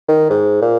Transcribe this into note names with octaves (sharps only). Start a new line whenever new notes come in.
D#3
G#2
A#2